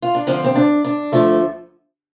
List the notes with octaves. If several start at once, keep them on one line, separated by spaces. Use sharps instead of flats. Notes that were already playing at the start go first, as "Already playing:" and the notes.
F4
D4
D2 D3 F3 C4
C4
D4
D4
D2 D3 F3 A3